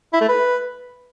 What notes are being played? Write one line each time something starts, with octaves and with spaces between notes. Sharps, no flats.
E4
A3
B4